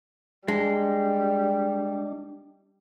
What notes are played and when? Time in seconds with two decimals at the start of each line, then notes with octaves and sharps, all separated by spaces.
0.48 G3 G#3 D4